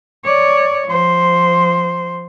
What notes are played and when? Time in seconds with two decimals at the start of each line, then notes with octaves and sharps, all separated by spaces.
0.24 C#5 D5
0.88 F3 C5